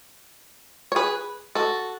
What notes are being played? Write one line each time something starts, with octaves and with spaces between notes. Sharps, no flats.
C#5
G#4 B4
F#4 A4